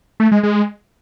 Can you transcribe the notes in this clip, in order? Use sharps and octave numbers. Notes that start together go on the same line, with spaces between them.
A3
G#3
G#3